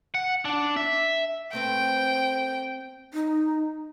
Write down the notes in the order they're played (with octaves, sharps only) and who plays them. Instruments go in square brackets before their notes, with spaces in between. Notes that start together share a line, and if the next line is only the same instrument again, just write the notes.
[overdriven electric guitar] F#5
D4
E5
[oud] A3 C4 B4 [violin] G5
[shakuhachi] D#4